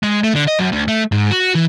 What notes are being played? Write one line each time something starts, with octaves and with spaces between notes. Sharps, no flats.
G#3
A3
D3
D#5
F#2
D2
A3
G#2
F#4
E3